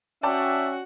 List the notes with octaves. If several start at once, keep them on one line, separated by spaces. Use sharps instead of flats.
C#4 F#4 D5 E5 F#5 G5 A5